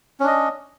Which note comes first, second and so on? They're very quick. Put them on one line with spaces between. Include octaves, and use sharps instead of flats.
C#4 D4 D#5